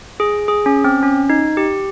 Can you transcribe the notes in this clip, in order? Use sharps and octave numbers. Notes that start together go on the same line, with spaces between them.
G#4
G#4
C#4
C4
C#4
D#4
G4